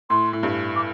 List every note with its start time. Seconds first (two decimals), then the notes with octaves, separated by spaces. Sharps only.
0.10 A2 C6
0.33 A2
0.43 G2
0.76 D6